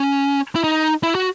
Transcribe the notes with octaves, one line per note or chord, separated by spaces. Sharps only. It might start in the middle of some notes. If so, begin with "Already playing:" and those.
Already playing: C#4
E4
D#4
E4
F#4